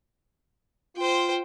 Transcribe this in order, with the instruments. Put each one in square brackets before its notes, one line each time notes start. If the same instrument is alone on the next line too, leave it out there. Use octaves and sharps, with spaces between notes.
[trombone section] F4 [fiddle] C5 G5